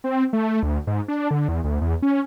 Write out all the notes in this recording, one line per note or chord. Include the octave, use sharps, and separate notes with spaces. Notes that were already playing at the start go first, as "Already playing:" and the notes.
C4
A3
D2
G#2
D4
D3
E2
D2
E2
C#4